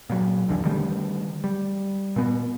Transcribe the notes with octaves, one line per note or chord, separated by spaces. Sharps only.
A#2 F#3
A#1 E2 D3 E3
D3 D#3 G3 A3
G3
A#2 B3